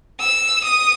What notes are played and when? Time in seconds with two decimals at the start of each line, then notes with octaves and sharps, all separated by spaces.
0.19 E6
0.64 D#6